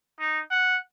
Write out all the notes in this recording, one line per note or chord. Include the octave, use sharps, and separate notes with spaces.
D#4
F#5